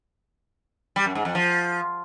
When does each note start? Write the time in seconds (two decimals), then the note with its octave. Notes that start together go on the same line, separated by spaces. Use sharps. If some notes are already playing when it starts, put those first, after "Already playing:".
0.96 G3
1.06 F#2
1.15 G#2
1.25 F2
1.35 F3